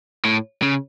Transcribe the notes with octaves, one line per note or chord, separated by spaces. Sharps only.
A2
C#3